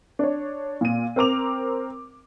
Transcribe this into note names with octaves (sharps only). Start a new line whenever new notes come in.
D4 C#5
A#2 D#7
C4 A#4 D6 F7